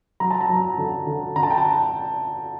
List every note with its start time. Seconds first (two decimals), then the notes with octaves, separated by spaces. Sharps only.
0.20 F#3 A#5
0.31 A5
0.41 A#5
0.49 F#3
0.78 D3
1.07 D3
1.36 D3 A#5
1.43 A5
1.51 G5
1.58 A5